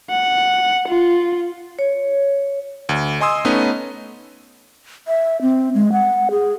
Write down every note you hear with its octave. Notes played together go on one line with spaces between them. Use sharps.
F#5
F4
C#5
D2
D#5 G#5 C6 D#6 E6
A3 B3 C#4 D#4 D#5
E5
C4
G#3
F#5
G#4